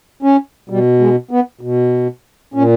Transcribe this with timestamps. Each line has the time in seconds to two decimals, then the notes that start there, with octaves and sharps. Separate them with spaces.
0.23 C#4
0.70 B2 G3
1.00 G#3
1.31 B3
1.61 B2
2.54 A#2 C#4